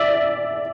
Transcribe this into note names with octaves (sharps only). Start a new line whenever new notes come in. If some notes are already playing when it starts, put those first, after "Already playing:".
Already playing: D5 E5